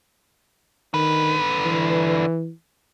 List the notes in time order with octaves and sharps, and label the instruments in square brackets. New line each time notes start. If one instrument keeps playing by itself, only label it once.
[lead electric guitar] D3 B4 [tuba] D#3
[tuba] E3